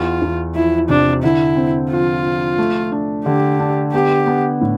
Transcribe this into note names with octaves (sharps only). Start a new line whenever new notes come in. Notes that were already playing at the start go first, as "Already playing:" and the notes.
Already playing: E2 F4
E2
F3 E4
C3 D4
D3 E4
C4
F3 F4
F3
A3
D4
D3 G4
D4
B3 G4
B3
A2